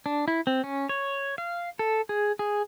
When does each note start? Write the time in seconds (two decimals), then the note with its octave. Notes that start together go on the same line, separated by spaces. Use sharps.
0.06 D4
0.28 E4
0.47 C4
0.64 C#4
0.89 C#5
1.38 F5
1.79 A4
2.09 G#4
2.39 G#4